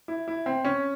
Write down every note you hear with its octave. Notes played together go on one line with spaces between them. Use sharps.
E4
E4
C4
C#4